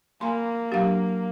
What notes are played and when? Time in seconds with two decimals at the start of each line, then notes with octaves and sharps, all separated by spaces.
0.21 A#3 G#5 B5 C6
0.72 F#3 D4 G4 F5